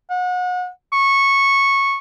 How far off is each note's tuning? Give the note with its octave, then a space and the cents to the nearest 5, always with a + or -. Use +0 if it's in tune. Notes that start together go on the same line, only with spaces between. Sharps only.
F#5 -35
C#6 -10